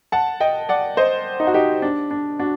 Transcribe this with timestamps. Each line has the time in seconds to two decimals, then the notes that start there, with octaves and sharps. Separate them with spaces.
0.12 F#5 A5
0.40 D#5 G5
0.69 D5 F#5
0.97 C5 D#5
1.40 D#4
1.47 F#4
1.54 D#4 G4
1.82 D4
2.11 D4
2.39 D4 F#4